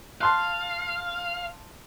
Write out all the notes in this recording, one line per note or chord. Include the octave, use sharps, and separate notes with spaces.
F5 A5 C6 F#6